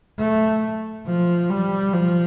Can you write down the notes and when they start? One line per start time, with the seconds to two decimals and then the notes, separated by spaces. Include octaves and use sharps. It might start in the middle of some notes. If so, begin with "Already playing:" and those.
0.19 A3
1.06 F3
1.50 G3
1.93 F3